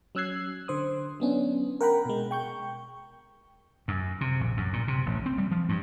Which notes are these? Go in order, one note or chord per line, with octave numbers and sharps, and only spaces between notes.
F#3 C#4 E6 F#6 G#6 C7
D3 C5 D#6
F#3 B3 C#4 D4
A#4 F#5 G5 A#5 B5
B2 G#3
G5 C#6 G6
F#2
C3
A#1
F#2
A#2
C3
A1
C4
G3
F3
G2